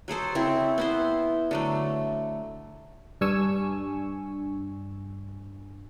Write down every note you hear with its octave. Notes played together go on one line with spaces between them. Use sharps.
F#3 G#4 A4 C5
C#3 C4 E4
B3 E4 C5
D3 F#3 A3
G2 D4 G#5 C#6 E6